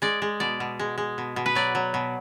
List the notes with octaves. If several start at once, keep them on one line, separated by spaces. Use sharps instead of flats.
G#3 D5
G#3
B2 D5
B2
G#3
G#3
B2
B2
B4
F#3 D5
F#3
B2